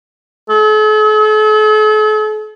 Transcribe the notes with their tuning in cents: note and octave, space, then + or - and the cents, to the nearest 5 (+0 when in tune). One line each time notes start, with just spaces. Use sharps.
A4 -45